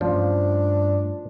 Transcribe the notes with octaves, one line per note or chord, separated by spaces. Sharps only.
G2 F3 A3 C#4 D4